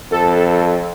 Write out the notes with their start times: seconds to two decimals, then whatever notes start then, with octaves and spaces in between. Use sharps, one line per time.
0.11 F2 A4